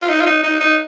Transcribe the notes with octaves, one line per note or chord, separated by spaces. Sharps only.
F4
D#4
F4
D#4
D#4
D#4